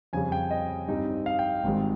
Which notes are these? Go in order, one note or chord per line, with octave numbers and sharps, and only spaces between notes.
F2 C#3 G3 C#4 G#5
G5
D#5
G2 G3 C4 D#4
F5
G5
G#1 G#2 D#3 G3 C4